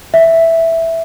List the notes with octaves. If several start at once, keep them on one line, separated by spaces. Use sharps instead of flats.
E5